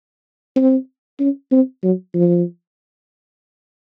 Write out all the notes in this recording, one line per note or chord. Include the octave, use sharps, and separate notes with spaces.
C4
C#4
C4
F#3
F3